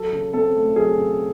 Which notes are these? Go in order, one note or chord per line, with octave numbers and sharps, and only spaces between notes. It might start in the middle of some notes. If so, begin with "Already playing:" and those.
Already playing: F#3 A4
C#3
C4 A4
A3
F#3 G#4
C#3